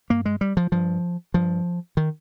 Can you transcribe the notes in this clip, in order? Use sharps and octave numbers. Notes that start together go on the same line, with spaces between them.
G2 A#3
G#3
G3
F3
G2 F3
G2 F3
D#3